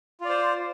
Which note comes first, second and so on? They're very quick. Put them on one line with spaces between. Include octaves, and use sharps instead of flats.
F4 D5 C5